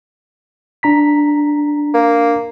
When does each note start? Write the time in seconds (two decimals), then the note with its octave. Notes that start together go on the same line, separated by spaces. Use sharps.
0.83 D4 A#5 B6
1.94 A#3